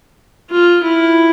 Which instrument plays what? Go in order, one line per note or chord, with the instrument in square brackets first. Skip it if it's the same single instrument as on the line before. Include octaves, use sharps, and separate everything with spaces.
[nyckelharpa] F4
E4